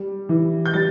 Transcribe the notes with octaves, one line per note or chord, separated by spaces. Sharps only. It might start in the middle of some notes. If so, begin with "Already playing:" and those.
Already playing: G3
E3
G6
G3 A6